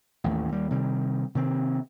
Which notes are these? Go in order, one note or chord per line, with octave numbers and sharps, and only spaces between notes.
A1 D#2 A3
D#2 G3
C3 D#3 G3
C3 D#3 C4